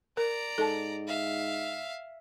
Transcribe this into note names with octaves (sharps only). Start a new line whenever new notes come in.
A#4 D5 A#5
G#2 A4 A5
E5 F5